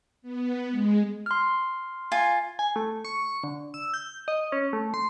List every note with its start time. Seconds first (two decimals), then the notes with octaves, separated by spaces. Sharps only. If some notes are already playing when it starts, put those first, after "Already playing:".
0.22 B3
0.71 G#3
1.26 C6 F6
2.12 F4 G#5
2.59 G#5
2.76 A3
3.05 C#6
3.43 D3
3.74 E6
3.94 G6
4.28 D#5
4.52 C#4
4.73 A3
4.94 C6